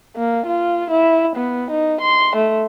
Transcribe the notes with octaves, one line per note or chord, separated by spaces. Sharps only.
A#3
F4
E4
B3
D#4
C6
A3